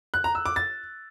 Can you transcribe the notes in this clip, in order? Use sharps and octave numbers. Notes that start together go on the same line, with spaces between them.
F#6
A#5
E6
D6
A6